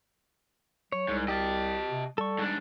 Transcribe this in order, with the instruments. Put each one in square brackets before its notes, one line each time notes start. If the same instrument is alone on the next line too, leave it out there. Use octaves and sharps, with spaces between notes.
[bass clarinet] F#3 [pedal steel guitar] C#5
[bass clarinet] C2 [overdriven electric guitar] G#2
[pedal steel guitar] G4 [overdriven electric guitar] D#5 A5
[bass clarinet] C3
[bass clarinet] G3 [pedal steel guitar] A4 C#6
[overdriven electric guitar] G#2 D4